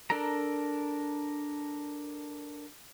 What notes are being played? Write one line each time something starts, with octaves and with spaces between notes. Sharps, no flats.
D4 A4 A#4 A#5